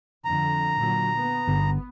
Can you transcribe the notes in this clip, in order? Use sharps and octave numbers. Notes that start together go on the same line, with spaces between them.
F2 D3 A#5
A#2 D3 F#3
B3
G1